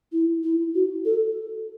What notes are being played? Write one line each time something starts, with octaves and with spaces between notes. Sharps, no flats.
E4
E4
F#4
A4